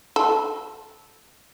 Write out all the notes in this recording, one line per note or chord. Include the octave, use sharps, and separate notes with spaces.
A4